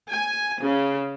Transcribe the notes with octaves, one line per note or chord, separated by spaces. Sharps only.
G#5
C#3